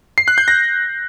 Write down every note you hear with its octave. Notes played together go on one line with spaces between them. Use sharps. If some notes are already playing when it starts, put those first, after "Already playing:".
C7
F#6
G6
A#6